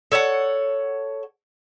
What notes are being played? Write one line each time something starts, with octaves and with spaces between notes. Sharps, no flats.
A4 C#5 E5 F#5